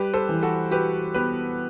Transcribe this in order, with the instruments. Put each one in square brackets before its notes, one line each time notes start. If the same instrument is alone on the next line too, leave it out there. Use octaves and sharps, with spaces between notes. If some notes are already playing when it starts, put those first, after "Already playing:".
Already playing: [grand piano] G3 [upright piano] G4 B4
[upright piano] A4 C5
[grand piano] E3
[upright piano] F#4 A4
[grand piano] F#4 [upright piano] G4 B4
[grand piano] B3 [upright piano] G4 B4